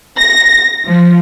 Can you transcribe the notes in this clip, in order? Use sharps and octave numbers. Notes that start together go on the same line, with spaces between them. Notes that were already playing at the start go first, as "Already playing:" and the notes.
A#6
F3